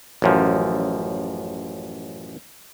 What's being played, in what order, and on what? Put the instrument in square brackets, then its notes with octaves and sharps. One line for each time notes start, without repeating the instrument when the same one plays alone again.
[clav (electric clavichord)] A1 F#2 F3